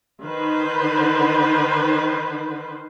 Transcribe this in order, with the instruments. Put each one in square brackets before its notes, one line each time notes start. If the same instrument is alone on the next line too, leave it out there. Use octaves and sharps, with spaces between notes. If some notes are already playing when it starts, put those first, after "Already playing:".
[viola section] D#3 B4 C5